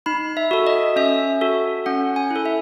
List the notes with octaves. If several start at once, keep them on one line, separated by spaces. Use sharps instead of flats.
D#4 B5
E5
F#4 A4
D#5
C#4 E5
F#4 A4
C#4 F#5
G#5
E4
A4
E5